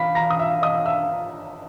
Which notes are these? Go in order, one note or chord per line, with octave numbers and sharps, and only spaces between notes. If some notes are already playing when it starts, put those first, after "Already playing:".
Already playing: F5 B5 B6 C7
A#5 A#6
D#6
E5 F5 E6
D#5 D#6
E5 E6